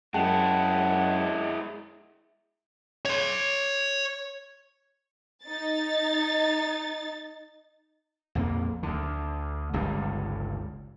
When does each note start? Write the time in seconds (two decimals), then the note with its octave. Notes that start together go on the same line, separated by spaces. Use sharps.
0.14 F#2 G#3 E4 F#5 G5 A5
3.05 C#5 C6
5.44 D#4 A6
8.35 A#1 F2 D3 A#3
8.83 D2 D3
9.73 G1 C#2 G2 D3